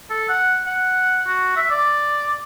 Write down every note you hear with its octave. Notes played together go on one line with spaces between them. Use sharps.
A4
F#5
F#5
F#4
E5
D5